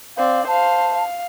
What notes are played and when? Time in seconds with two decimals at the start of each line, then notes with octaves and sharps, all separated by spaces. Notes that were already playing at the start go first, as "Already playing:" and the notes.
0.17 C4 D5 F5
0.48 C5 F5 A5
0.95 F5